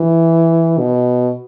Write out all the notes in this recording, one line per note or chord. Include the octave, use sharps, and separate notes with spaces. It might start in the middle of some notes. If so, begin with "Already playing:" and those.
Already playing: E3
B2